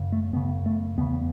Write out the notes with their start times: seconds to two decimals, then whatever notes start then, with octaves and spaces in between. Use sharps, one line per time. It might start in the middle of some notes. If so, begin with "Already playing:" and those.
Already playing: F#2 C#3
0.12 A3
0.33 F#2 C#3 B3
0.66 A3
0.98 E2 C#3 B3